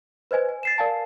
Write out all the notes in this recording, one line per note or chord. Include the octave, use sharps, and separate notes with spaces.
B4 C5 D#5 G#5
G#5
A6 C7 E7
A#4 D5 F5 G#5 A5